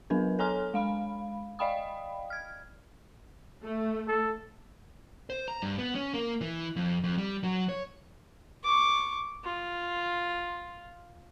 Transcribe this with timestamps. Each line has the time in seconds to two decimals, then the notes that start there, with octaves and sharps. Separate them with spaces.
0.10 F#3 B3 D4 A#4 B4
0.39 A4 C#5 G#5 A#5 C6 F6
0.74 G#3 F5 B5
1.59 D5 D#5 F5 G5 B5 D#6
2.30 F6 G#6
3.64 A3
4.08 A4
5.30 C5
5.48 A#5
5.62 G2
5.79 B3
5.95 C#4
6.14 A#3
6.41 E3
6.76 F2
7.04 F2
7.18 G3
7.43 F#3
7.69 C#5
8.64 C#6 D6
9.44 F4